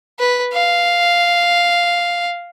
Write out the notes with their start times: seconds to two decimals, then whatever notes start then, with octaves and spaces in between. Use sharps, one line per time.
0.20 B4
0.54 F5